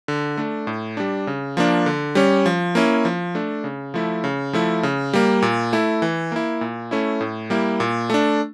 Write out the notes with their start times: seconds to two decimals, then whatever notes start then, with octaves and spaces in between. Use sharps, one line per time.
0.08 D3
0.37 A3 D4
0.67 A2
0.97 G3 D4
1.27 C#3
1.57 F3 A#3 D4
1.86 D3
2.15 G3 C#4
2.46 F3
2.75 A#3 C#4 E4
3.05 F3
3.35 A3 D4
3.64 C#3
3.94 F3 A3 E4
4.24 C#3
4.53 F3 A3 E4
4.83 C#3
5.13 G3 A#3
5.42 A#2
5.73 A3 E4
6.02 E3
6.32 A#3 E4
6.61 A#2
6.91 A3 C#4 E4
7.21 A2
7.50 G3 A#3 E4
7.80 A#2
8.10 A3 D4